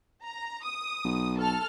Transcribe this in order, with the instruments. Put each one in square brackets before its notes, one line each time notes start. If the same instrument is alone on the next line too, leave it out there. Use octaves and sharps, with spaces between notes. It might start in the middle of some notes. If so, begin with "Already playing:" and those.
[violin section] A#5
D#6
[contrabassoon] B1
[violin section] A4 A5 F6